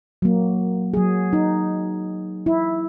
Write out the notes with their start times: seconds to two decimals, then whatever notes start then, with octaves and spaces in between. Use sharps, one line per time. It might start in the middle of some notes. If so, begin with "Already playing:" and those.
0.22 F#3 A#3
0.94 F#3 G#4
1.33 D#4
2.46 E4